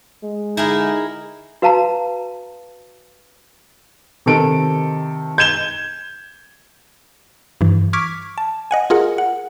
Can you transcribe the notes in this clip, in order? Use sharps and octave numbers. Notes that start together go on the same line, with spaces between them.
G#3
D3 D#4 E4 G#4 A#4
F#4 B4 F5 A5 A#5
C3 D#3 A4 D7
G6 G#6 E7 G7
G2 E3
C#6 D6 F6 G#6 B6 D7
A5
D#5 F#5 G#5
F4 G#4 A#4 F#5
F#5